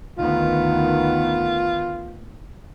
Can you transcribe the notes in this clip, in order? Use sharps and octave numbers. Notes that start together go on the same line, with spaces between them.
D2 D#3 B3 F4